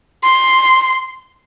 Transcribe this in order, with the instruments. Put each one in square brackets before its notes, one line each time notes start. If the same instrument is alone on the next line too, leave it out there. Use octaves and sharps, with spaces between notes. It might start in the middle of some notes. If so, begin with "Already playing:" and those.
[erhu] C6